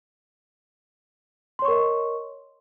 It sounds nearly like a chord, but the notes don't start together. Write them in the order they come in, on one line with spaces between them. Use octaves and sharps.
C6 C#5 C#6 A#4 D#5